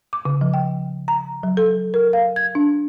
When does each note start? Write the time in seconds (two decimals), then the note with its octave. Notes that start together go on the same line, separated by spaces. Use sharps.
0.13 D6
0.25 C#3
0.41 F3
0.54 G5
1.08 A#5
1.43 F#3
1.57 A4
1.94 A#4
2.13 F5
2.36 G#6
2.55 D4